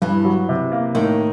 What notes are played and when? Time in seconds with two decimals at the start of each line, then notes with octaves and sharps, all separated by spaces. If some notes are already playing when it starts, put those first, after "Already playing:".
0.02 G2 E3
0.25 F#3
0.49 C3
0.72 A#3
0.95 A2 D#3